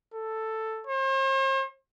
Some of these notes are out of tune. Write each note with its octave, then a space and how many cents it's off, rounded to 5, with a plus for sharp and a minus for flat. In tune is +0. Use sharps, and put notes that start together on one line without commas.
A4 +5
C5 +45